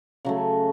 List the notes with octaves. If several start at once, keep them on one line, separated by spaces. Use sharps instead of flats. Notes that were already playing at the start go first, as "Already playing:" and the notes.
C#3 F#3 A3